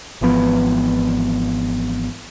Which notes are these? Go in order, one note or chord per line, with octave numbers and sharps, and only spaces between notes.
G#1 E3 F3 B3